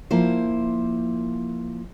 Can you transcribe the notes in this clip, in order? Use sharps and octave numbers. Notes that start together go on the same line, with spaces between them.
F3 A#3 E4 C5